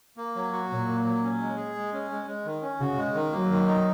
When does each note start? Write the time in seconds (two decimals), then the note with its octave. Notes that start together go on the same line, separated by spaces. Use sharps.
0.17 A#3
0.36 F#3
0.52 F#4
0.70 A#2 F#3
0.87 A#3
1.05 F#3
1.23 C#4
1.41 G#3
1.57 G#4
1.75 G#3
1.93 C#4
2.10 G#3
2.27 G#3
2.46 D#3
2.62 C#4
2.80 C#3 F#4
2.97 G#3
3.15 D#3
3.32 F#3 A#3
3.50 D#3
3.67 D#4